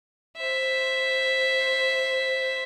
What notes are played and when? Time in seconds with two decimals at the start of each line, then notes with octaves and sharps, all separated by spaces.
0.37 C5 E5